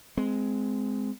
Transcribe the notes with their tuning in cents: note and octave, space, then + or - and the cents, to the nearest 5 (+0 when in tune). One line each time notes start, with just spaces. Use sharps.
G#3 +10 C4 -20